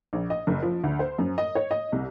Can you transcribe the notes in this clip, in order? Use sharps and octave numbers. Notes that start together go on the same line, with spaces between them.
A#1
D#5
F#1
F3
D2
C5
F#2
D#5
C#5
D#5
C2